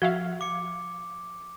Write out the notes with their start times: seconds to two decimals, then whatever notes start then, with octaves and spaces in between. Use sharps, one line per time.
0.02 F3 F#4 E5 F5
0.41 D6 C#7